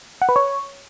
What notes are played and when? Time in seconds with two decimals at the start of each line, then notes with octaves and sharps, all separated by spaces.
0.22 F#5
0.29 B4
0.36 C#5